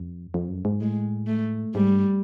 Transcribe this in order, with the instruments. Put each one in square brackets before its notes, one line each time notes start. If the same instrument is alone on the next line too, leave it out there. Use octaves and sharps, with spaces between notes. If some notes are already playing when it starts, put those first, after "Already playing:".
Already playing: [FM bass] F2
F2
F#2
G#2
[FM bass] A2 [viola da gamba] G#3
[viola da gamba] A3
[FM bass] G#2 [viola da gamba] G3
[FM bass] G2